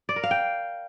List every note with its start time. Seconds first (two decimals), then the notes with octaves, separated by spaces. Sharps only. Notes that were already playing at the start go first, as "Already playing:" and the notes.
0.09 D5
0.16 A#4
0.23 F5
0.31 G5